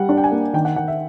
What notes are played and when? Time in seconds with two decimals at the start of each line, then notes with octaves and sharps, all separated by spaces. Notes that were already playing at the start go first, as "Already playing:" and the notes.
Already playing: G3 F#5
0.09 D4
0.17 G5
0.24 G#5
0.32 A#3
0.53 D#3 G5
0.65 F#5
0.76 D#3 F#5
0.88 E5